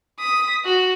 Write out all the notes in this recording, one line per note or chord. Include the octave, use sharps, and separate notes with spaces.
D#6 B6
F#4